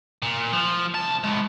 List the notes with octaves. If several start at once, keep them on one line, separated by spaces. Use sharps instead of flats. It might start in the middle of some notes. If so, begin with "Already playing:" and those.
A#2
F3
C2 A5
A2 G#3